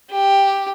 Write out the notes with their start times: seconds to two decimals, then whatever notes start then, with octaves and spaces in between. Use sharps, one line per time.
0.11 G4